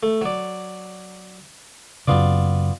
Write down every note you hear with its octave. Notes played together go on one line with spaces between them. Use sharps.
A3
F#3 D5
F#2 C#3 B3 F4 D5